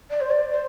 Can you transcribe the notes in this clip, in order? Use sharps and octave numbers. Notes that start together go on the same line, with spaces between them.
D5
C5
D5
C5